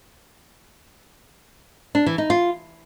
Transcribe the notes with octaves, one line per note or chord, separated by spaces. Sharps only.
D4
E3
D#4
F4